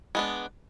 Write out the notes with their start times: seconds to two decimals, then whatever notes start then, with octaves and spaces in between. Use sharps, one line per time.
0.15 G#3 B3 D4